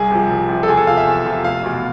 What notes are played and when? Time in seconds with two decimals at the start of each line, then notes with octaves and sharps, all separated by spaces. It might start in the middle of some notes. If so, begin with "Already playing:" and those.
Already playing: C2 G#4
0.11 C3 F3
0.30 C2
0.49 C3 F3
0.63 A4
0.68 E2 G#4
0.77 A4
0.87 C3 F3 F5
0.97 E5
1.07 E2
1.25 C3 F3
1.44 F1 F5
1.63 E2 B2